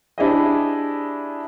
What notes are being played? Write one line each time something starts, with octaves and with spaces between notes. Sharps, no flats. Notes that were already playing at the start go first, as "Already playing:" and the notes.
D4 E4 G4 G#4 C5 D#5